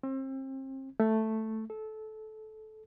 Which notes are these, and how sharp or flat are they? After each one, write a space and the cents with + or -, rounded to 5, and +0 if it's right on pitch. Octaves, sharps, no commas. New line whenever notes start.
C4 +35
A3 +0
A4 -20